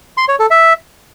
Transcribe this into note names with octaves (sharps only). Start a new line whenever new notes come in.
C6
C#5
A4
E5